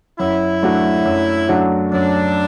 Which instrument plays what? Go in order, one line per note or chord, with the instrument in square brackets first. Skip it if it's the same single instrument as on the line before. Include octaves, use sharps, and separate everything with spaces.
[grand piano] F#2 [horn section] E4
[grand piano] F#3 A3 D4 F#4
F#2
F#3 A3 D4 F#4
[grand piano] F#2 [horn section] D4